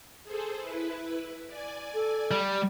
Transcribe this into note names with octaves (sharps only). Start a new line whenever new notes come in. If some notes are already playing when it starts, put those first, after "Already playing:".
G#4 A4 C5
E4 B4
D5 G#5
A4
G3